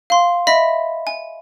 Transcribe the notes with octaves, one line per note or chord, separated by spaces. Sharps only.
F5 C6
D#5 E5 B5 B6
G#5